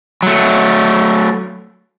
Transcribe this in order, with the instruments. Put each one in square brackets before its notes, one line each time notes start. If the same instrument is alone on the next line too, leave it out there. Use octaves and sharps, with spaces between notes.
[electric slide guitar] F#3 A3